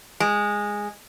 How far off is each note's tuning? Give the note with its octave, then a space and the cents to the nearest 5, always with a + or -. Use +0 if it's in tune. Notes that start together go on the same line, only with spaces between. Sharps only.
G#3 -10